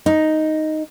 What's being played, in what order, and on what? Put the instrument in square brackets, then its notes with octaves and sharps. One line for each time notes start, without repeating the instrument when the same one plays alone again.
[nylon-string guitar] D#4